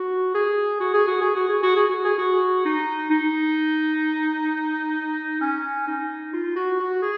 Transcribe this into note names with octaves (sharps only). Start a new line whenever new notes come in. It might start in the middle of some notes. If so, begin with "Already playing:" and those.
Already playing: F#4
G#4
F#4
G#4
F#4
G#4
F#4
G#4
F#4
G#4
F#4
G#4
F#4
D#4
D#4
C#4
D#4
F4
F#4
F#4
G#4